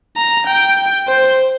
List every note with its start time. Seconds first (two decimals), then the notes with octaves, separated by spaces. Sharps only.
0.17 A#5
0.47 G5
1.08 C5